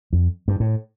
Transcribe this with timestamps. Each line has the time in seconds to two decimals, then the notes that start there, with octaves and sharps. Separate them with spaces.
0.13 F2
0.48 G2
0.60 A2